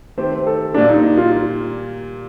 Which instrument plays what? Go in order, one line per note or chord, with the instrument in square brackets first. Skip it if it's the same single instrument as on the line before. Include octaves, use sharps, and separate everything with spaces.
[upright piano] D#3 A3 C4 G4 [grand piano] C5
[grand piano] C5
A4
[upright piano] A#2 G3 A#3 [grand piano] D4
[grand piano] D#4
D#4
F4